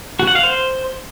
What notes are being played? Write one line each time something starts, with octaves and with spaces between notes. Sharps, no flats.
F#4
F#5
F5
C5